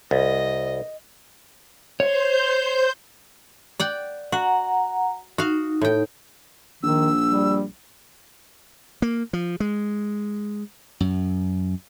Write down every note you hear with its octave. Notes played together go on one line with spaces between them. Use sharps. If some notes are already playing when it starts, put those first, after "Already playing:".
C2 D#5
C5 C#5 G6
D5 F#5 G5
F#4 F#5 A#5
D#4 F#4 F5
A2 G5
A#1 D#3 E6
G3
A#3
F3
G#3
F#2